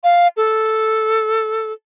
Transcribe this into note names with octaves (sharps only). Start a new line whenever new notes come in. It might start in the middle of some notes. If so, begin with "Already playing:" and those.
F5
A4